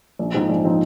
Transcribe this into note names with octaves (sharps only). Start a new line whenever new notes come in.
A#1
G#2 F3 C4 D#4
A#1
F3 C4 D#4